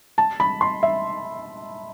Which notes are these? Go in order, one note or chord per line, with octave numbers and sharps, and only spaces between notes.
A5
B5
C6
E5